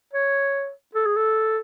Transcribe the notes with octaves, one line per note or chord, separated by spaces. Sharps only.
C#5
A4
G#4
A4